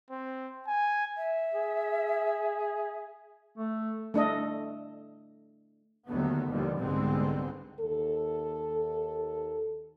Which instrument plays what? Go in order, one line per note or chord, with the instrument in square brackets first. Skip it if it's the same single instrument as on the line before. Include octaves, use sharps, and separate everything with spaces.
[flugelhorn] C4
G#5
[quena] E5
[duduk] G#4
A3
[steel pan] A3 D4 A4 D#5
[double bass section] D#2 D3 D#3 F#3 A3 B3
D#2 B2 D3 F3 G3
C2 G#2 D3 G#3 B3 C4
[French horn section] D#2 A4